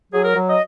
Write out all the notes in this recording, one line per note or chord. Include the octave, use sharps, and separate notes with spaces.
F#3 G#4
A#4
F#3
D#5